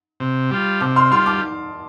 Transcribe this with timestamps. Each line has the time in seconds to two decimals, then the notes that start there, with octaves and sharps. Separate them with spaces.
0.20 C3
0.51 G3 F4
0.80 C3 A5 D6
0.96 C6 F6
1.11 G3 F4 C6 F6
1.26 A5 D6